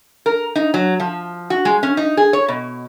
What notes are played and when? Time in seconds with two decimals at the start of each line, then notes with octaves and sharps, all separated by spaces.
0.26 A#4
0.56 D#4
0.74 F#3
1.00 F3
1.50 F#4
1.65 G#3
1.83 C#4
1.97 D#4
2.17 G#4
2.33 C#5
2.48 B2